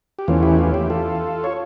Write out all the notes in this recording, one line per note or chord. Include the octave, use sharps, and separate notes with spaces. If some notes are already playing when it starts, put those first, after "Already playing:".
G4
E2 E3 A3 C#4 F4
E4 G4
F4
E4 G4
F4 A4
C#5